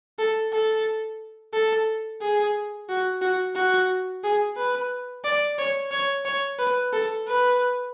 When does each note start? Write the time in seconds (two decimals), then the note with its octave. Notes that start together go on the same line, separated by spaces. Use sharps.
0.19 A4
0.52 A4
1.53 A4
2.21 G#4
2.89 F#4
3.22 F#4
3.56 F#4
4.23 G#4
4.57 B4
5.24 D5
5.58 C#5
5.91 C#5
6.25 C#5
6.58 B4
6.93 A4
7.27 B4